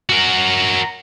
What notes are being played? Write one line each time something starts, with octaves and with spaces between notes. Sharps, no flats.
F#4 A#4